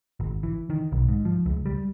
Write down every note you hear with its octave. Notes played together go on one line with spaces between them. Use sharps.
G#1
E3
D#3
B1
G#2
F3
C#2
G3